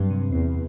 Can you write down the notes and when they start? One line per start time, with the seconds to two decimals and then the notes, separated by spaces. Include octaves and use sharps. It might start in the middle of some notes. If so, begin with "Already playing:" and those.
Already playing: G2 F#3 C4
0.10 C3
0.32 E2 C4